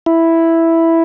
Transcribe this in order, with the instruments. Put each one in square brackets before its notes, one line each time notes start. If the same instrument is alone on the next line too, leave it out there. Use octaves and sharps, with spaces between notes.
[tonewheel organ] E4